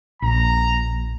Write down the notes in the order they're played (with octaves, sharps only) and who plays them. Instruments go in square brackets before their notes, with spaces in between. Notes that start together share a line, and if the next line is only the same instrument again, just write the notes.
[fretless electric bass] A#1 [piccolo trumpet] A#5